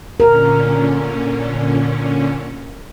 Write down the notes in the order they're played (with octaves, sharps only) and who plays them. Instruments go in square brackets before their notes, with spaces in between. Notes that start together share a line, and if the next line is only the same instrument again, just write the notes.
[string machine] A#2 D3 C#4 [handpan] A#4